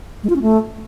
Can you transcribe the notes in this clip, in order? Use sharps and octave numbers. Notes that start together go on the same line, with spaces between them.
G#3
F4
C#4
A3